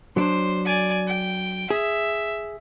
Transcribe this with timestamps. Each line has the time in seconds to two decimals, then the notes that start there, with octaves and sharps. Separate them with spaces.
0.17 F#3 D4 C5
0.65 D5 G#5
1.08 G5
1.70 G#4 E5